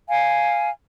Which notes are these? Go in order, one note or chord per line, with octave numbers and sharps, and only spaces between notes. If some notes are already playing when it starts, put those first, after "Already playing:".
F5 G#5